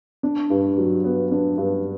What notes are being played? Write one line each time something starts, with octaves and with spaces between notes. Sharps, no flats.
D4
G2
F#3
B3
D4
G2